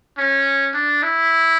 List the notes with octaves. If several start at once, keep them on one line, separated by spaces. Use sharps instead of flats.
C#4
D4
E4